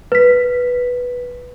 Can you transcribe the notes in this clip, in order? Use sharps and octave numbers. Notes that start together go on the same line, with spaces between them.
B4 B6